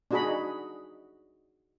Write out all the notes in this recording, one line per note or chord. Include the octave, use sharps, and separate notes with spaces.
D4 D#4 F#4 G#4 D#5 B5